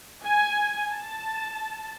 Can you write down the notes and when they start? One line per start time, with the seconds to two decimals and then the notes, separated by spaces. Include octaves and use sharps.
0.25 G#5
0.92 A5